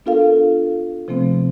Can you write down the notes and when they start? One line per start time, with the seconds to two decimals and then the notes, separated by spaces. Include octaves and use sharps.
0.06 B3 D4 F4 A4 A#4 F5
1.08 C3 F3 A3 B3 C4